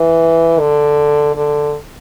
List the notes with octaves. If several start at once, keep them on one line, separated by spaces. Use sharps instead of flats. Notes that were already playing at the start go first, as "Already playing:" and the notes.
Already playing: E3
D3
D3